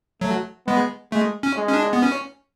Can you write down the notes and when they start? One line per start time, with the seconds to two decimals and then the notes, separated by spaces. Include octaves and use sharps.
0.21 F#3 A3
0.67 G#3 B3
1.12 G#3 A3
1.43 C#4
1.57 G#3
1.68 C#4
1.74 D4
1.93 B3
2.03 C#4